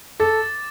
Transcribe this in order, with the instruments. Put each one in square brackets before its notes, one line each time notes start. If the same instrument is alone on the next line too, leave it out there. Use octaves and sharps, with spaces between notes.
[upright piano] A4 [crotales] D6 A6